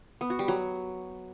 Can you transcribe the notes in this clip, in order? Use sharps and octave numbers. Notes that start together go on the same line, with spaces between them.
B3
F#4
G3
F#3